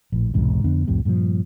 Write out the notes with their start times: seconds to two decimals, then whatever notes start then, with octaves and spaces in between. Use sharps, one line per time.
0.12 A#1 A2
0.34 B1 E2 G#2 C3
0.64 F2 D3 B3 D4
0.87 C2 F2 A2 C3
1.05 G2 A#2 D3 F3